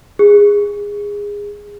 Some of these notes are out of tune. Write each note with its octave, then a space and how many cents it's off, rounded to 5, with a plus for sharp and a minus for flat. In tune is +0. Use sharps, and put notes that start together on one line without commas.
G#4 -20